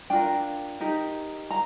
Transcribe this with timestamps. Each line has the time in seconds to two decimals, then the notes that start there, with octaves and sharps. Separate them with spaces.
0.10 D4 F4 A#4 G5
0.80 D#4 G4 A#4
1.51 A#5